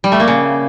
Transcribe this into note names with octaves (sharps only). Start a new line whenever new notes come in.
G3
A3
A#3
C#3